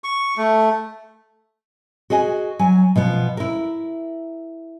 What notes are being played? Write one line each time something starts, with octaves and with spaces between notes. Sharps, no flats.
C#6
A3
F#4 G#4 D#5 G#5
F#3 G#5
B2 F3 B3
E4 A#4